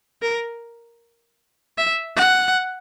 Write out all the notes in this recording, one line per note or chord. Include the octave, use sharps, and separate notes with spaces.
A#4
E5
F#5